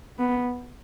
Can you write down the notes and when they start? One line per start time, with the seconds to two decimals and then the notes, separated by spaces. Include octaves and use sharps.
0.18 B3